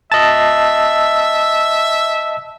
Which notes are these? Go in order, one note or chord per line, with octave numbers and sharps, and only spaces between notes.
D#5 E5 A5